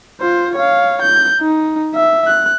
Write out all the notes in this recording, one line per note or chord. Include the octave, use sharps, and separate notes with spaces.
F4 C5
C#5 F5
G6
D#4
E5
F#6